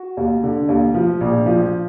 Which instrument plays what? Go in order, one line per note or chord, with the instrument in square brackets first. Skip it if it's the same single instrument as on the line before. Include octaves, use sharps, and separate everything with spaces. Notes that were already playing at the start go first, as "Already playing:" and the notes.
Already playing: [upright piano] F#4
D#2
D3
D#2
F3
A#1
F3